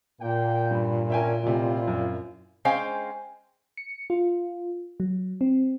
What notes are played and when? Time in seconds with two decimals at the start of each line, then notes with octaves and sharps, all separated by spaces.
0.21 A#2 A#3 G5
0.71 G2 B5
1.10 C#4 D4 A#4 E5 G5 G#5
1.44 A1 C3 C4 E4 F4
1.88 F#2
2.65 G#3 C#4 C5 F5 G5
3.77 C#7
4.10 F4
5.00 F#3
5.41 C4